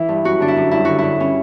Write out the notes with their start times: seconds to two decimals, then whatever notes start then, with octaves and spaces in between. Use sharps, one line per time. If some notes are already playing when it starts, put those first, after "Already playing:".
Already playing: E3 E4
0.09 G2
0.24 F#2 F#4
0.40 D3 D4
0.48 E4
0.56 F#2
0.71 G2 E4
0.85 D3 F#4
0.98 G2 E4
1.20 C#4